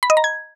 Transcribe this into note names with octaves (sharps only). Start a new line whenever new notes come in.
B5
D#5
A#5
G#6